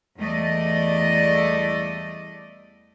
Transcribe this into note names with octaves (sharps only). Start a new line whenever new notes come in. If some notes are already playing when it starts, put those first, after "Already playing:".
E2 G3 A3 D5 D#5